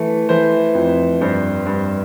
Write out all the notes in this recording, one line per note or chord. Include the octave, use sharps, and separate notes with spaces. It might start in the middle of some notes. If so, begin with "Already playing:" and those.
Already playing: E3 A3
E3 C5
F2
G2 C5
G2